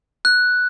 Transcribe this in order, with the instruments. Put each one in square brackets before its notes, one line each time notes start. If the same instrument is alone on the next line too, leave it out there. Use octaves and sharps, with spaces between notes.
[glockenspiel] F#6